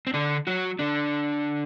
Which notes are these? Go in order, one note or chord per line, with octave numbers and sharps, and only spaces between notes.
C4
D3 D4
F#3 F#4
D3 D4